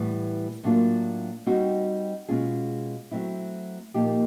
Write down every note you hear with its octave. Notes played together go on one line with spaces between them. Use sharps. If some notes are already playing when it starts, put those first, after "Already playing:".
Already playing: A2 E3 G3 B3
A2 F#3 A#3 D4 F4
G3 C4 D#4 F#4
B2 G#3 C#4 F4 G#4
F#3 A3 C4 E4
A#2 F3 A#3 D#4 G4